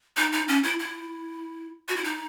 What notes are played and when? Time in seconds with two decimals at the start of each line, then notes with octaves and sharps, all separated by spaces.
0.17 D#4
0.32 D#4
0.48 C#4
0.63 E4
0.79 E4
1.89 F#4
1.96 E4
2.04 D#4